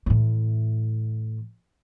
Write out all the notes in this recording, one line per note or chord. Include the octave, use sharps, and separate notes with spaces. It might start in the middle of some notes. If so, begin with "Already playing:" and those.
A2 E3